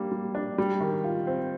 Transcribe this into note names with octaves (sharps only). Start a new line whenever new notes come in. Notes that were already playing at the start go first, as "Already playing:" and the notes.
Already playing: G3 A#3 D4
G3
D4
G3
D#3
F4
C4